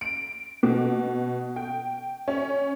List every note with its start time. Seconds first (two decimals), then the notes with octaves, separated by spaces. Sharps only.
0.01 D7
0.63 B2
1.56 G5
2.28 C#4